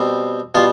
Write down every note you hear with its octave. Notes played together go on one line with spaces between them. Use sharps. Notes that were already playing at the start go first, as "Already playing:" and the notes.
Already playing: B2 G3 C4
B2 G3 F4